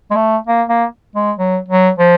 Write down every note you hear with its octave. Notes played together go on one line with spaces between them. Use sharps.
G#3
A3
A#3
A#3
G#3
F#3
F#3
F3